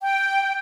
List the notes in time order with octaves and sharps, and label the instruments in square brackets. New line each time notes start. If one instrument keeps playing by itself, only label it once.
[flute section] G5